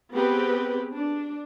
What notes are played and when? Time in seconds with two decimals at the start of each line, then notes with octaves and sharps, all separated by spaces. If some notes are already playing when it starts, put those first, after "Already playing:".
0.12 B3 C4 G4 G#4 B4
0.95 D4